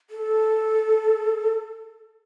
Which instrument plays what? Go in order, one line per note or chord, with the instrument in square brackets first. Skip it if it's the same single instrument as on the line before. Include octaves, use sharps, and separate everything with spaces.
[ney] A4